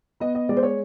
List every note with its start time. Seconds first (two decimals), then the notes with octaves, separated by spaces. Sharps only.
0.20 B3 D#5
0.35 D#5
0.49 G#3 D5
0.57 C5
0.63 C#5